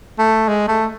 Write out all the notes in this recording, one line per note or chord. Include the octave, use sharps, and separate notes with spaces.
A3
G#3
A3